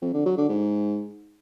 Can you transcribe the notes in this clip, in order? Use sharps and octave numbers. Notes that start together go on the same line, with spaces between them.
F2
D3
F#3
D3
G#2